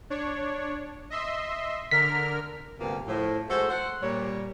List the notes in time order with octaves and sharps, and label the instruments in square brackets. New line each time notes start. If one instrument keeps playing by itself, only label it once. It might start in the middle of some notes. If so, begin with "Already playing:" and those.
[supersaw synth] D4 C#5
D#5 E5 C6
[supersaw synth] D3 A#4 F6 [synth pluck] B6
[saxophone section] D2 G2 C3 A#3 B3 F4
A2 F3
G#3 A3 F#4 A4 C5
C5 F#5
A#2 G3 C#5